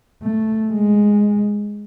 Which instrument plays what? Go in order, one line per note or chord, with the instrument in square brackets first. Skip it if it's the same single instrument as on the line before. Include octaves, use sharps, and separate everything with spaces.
[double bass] A3
G#3